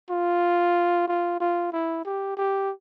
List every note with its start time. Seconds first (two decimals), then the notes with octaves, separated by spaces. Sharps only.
0.10 F4
1.07 F4
1.40 F4
1.73 E4
2.05 G4
2.37 G4